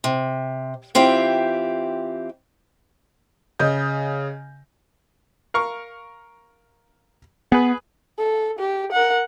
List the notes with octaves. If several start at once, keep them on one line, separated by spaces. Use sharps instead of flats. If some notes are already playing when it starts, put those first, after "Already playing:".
C3
E3 C4 F4 G4 E5
C#3 D#5 G6
A#4 F5 C#6
B3 G#4 B4
A4
G4
A#4 F#5